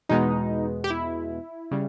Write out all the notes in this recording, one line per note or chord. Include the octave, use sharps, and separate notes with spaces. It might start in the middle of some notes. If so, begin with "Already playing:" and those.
E2 B2 G#3 B3 D#4
G4
E4
C#3 G3